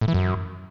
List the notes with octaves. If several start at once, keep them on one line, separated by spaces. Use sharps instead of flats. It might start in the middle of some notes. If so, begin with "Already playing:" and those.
A2
E3
F#2